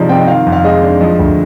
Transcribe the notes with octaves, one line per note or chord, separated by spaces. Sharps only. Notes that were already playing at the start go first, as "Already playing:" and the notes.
Already playing: C3 F3 G#3 D#4 D5 D#5
C4 G5
D#5
D#3 F5
F2
F5
G#3 D#5
D4
F3 D#5
D2